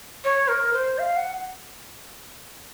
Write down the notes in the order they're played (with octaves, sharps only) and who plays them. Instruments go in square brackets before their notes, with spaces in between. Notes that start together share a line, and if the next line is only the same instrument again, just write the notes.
[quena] C#5
A#4
C5
F5
F#5